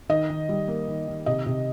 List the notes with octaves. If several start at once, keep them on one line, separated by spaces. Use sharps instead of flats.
D#3 D#5
D#3
G3
A#3
D#3
D#3
C3 D#5
C3